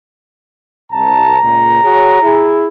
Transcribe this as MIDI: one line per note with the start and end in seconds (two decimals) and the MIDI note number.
0.92 1.37 36
0.92 1.37 81
0.92 2.56 82
1.42 1.80 37
1.42 1.80 46
1.83 2.21 66
1.83 2.21 68
1.83 2.21 73
2.22 2.67 64
2.22 2.67 68